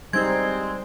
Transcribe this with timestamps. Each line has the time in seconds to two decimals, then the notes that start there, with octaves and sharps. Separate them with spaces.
0.13 G3 G#3 C4 D#4 C5 G#6